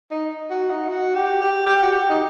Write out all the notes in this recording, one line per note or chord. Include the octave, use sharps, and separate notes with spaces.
D#4
F#4
D#4
F#4
G4
G4
G4
F#4
G4
D#4